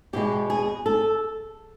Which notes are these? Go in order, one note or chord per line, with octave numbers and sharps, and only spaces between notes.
E2 B2 G#3 B3 G4
G#4
A4